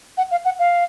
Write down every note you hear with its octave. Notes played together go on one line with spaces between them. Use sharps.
F#5
F5
F#5
F5